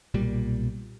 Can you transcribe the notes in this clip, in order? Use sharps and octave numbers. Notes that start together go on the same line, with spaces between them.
B1 A#2 G3